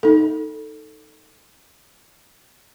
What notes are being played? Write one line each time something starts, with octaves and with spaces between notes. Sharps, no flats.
D#4 A4